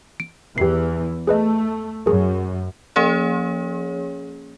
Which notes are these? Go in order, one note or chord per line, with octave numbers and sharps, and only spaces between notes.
D7
E2 E3 G4 C7
A3 G#4 B4 D#5
F#2 G#4 A#4
F3 A#3 C#4 G#4 C#5